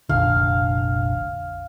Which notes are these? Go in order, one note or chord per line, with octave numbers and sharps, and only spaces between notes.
F1 A#1 D3 F5